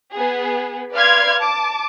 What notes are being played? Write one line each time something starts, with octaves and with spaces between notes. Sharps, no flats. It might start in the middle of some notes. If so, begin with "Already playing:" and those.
B3 G#4
B4 D5 F5 C6 F6 G#6
A5 D6